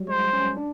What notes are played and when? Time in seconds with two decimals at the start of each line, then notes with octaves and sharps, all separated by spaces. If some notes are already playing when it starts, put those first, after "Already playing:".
Already playing: F#3 G3
0.08 G#3 C5
0.33 C#4
0.57 D4